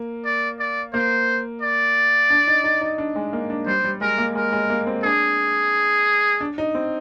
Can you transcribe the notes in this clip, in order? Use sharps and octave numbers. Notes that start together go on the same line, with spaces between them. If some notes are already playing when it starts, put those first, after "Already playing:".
Already playing: A#3
D5
D5
A#3 C5
D5
D4
D#4
D#4
D#4
D4
G#3
A#3
D4
G3 C5
G3
G#3 A#4
A#3
G#3 A#4
G#3
A#3
C4
D4 G#4
D4
D#4
C4